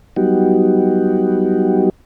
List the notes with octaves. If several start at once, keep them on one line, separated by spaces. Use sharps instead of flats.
F#3 G3 B3 D#4 F#4 G4